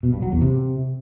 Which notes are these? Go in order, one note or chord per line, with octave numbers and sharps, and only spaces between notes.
B2
G2
F#3
E2
C3